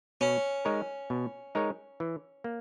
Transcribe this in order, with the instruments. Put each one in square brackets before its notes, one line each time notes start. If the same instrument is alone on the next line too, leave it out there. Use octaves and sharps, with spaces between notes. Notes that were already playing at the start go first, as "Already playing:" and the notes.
[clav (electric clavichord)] B2 [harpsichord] C#4
[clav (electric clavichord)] G#3 D#4 A#4 C#5
B2
G#3 D#4 A#4 C#5
E3
A#3